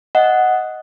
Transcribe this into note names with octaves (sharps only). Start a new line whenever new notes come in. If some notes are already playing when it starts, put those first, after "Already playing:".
D#5 F#5